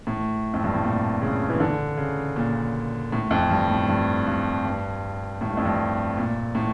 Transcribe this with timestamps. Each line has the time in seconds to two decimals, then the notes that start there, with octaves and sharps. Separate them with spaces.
0.07 A2
0.54 F2
0.63 G2
0.74 A2
0.83 A#2
1.22 C#3
1.49 E3
1.60 D3
1.97 C#3
2.36 A#2
3.12 A2
3.31 F2
3.50 G2
3.70 A2
3.88 G2
4.27 G2
4.65 G2
5.41 A2
5.48 G2
5.57 F2
5.65 G2
6.17 A#2
6.55 A2